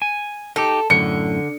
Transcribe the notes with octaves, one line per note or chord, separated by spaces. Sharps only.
G#5
D#4 G4 A4
F#2 A2 D3 C#7